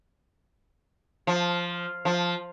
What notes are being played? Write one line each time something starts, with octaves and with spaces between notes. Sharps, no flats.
F3
F3